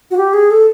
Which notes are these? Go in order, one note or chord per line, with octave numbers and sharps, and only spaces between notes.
F#4
G4
G#4
A4